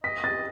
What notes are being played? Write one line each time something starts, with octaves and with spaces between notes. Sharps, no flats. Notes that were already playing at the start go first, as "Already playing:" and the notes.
D#5 B6
A6